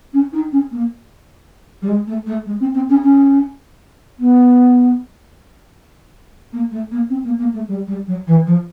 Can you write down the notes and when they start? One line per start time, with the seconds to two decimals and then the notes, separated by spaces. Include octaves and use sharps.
0.13 C#4
0.32 D#4
0.52 C#4
0.71 A#3
1.82 G3
1.88 G#3
2.07 A3
2.26 A3
2.46 G#3
2.60 C4
2.74 C4
2.89 C#4
3.03 C#4
4.19 B3
6.52 A#3
6.71 A3
6.91 A#3
7.09 C4
7.24 A#3
7.39 A#3
7.53 A3
7.68 G3
7.87 G3
8.07 F#3
8.27 E3
8.46 F3